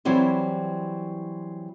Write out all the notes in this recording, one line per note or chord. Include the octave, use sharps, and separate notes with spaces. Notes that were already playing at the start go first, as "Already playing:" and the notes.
E3 F#3 G3 C4 E4